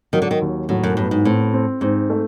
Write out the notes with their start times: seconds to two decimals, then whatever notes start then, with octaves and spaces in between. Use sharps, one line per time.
0.13 D#3 F#3
0.22 D3
0.31 D#3
0.42 D#2
0.69 A2 F#3
0.83 F#2
0.97 G2 B3
1.11 G#2
1.25 A2 C4
1.53 C4
1.81 G#2 C4
2.10 A3